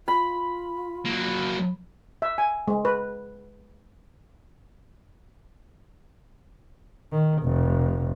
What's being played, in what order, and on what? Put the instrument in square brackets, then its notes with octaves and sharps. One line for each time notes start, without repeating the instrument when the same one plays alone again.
[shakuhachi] F4 [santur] B5
[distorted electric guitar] F#3 A#3
[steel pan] E5
G#5
G#3
B4
[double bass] D#3
F1